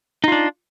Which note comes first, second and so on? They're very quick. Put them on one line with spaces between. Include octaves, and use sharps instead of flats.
D#4 F4 D4